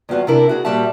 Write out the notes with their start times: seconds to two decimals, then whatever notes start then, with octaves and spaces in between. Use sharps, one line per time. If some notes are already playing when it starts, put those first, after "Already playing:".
0.09 E2 G2 F4 F#4
0.27 C3 D4 E4 A#4
0.49 F#4 G#4
0.65 A#2 G3 F#4 C5 E5 A5